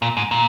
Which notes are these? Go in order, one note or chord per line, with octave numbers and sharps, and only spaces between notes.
A#2
G#2
A#2